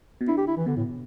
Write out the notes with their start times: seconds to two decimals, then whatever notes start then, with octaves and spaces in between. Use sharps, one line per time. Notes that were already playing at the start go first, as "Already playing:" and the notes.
0.21 B2
0.28 D3 E4
0.37 G4
0.47 E4
0.57 E3
0.66 B2 D3
0.76 A2